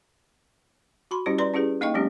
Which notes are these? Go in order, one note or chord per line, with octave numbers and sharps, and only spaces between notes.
F#4 B5 C6
G3 C#4 E4 G4 C5
B4 D5 A#5 C6
C#4 E4 G4 G#4 B4
A#3 D#4 D#5 F5 G5 C#6
F#3 G#3 B3 C#4 D4 G4